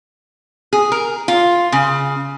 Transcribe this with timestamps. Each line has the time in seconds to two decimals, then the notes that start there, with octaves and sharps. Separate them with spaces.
0.73 G#4
0.92 A#4
1.28 F4
1.72 C#3